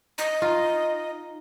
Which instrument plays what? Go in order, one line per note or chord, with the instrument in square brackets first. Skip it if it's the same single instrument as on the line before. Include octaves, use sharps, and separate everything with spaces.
[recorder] D#5
[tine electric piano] D#4 [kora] F4